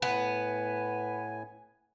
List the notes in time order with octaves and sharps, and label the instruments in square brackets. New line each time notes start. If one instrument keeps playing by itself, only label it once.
[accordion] A2 G#5 [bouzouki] B3 [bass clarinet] B4